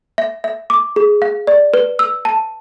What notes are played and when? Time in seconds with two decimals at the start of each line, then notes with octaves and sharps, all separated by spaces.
0.18 E5
0.44 E5
0.70 D6
0.96 G#4
1.22 F5
1.47 D5
1.74 B4
1.99 E6
2.25 A5